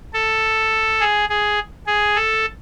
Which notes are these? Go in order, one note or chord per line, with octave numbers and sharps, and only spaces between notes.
A4
G#4
G#4
G#4
A4